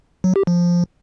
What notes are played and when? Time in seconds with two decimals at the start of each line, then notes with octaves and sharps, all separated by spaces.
0.24 F#3
0.36 G4
0.47 F3